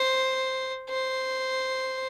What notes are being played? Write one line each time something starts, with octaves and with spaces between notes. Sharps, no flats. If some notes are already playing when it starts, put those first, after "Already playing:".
Already playing: C5
C5